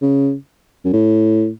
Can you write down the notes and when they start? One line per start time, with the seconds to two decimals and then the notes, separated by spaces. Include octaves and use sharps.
0.02 C#3
0.85 F#2
0.93 A2